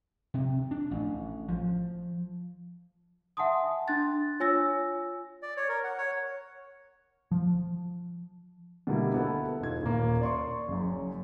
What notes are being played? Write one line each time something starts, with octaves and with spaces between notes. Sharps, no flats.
C3
D4
A1
F3
E5 F#5 G#5 A5 C6 D#6
D4 C6 F#6 A6
F4 C#5 G#5 E6 A#6
D5
C#5
A#4
F#5
C#5
F3
B2 D3 G3 A#3 E4
B3 E4 A4
E1 D#4 F4 G#6
D#1 A#3
D5 C6 C#6
F#1 F#2